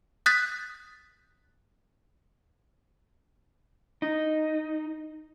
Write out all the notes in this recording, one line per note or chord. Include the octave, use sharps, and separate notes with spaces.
D#6 F#6 G6 A6 B6
D#4